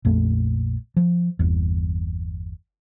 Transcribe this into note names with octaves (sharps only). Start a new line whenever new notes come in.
A#1 F2 A3
F3
G1 E2